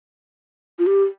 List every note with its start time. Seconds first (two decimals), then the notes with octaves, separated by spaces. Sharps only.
0.79 F4
0.87 G4